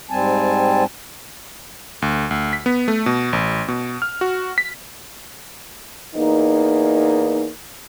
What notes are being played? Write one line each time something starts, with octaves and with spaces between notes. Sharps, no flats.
G#2 G3 C4 G#5 A5
D2
D2
B6
B3
A3
B2
A1
B2
F6
F#4
B6
E2 A#3 D#4